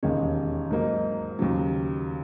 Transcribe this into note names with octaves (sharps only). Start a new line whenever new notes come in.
E1 D#2 D#3 G#3 C#4
G#2 F#3 A#3 D#4
D#2 C#3 F#3